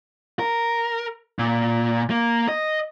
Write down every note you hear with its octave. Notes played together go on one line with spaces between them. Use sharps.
A#4
A#2
A#3
D#5